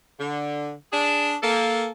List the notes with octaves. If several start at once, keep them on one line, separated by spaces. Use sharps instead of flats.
D3
D4 G#4
A#3 A4